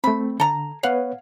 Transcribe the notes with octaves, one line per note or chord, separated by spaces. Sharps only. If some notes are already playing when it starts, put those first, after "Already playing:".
A3 C4 B5
D3 A4 A#5
B3 B4 C#5 F5 F#5